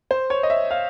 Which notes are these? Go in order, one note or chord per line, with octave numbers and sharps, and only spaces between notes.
C5
C#5
D#5
E5
F5